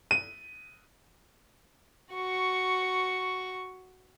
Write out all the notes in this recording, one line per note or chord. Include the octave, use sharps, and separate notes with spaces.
D#7
F#4 C#6